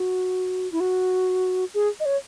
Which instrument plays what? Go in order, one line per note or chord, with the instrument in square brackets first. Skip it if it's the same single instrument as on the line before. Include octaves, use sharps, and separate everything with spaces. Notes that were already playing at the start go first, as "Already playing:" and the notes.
Already playing: [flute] F#4
E4
F#4
G#4
D#5
C#5